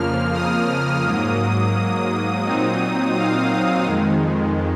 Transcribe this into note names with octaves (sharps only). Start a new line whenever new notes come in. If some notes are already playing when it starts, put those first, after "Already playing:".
Already playing: F2 C#3 F3 A#3 F6
D#6
G#2 F#3 A#3
A#2 F#3 C4 D#4
F5
F2 D#3 G#3